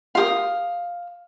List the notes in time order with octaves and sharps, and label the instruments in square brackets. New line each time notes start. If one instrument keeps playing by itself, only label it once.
[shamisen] F4 G4 A#4 [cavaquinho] F5 D#6